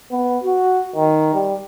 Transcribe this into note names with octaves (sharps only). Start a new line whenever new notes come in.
B3
F#4
D#3
G3